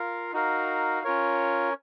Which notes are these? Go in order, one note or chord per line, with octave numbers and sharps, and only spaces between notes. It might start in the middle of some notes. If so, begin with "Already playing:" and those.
Already playing: F4 A#4 F5
D#4 F#4 A#4 F5
C#4 F4 A#4 C#5